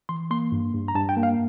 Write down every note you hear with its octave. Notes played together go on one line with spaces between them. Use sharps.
E3 C6
A#3 C6
G2
G2
A#5
G2 A5
G5
A#3
F5